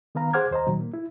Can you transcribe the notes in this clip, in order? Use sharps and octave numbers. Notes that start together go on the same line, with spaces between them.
D#3 B3 B4 F5 A#5
G#4 C5 F#5 D6 F6 G#6
D#2 C5 D#5 A#5
A#2 D#3 F#3
A#3
E4